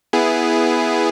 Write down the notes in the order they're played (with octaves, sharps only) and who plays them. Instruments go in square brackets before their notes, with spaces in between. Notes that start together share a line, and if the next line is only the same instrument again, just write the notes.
[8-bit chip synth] B3 E4 G#4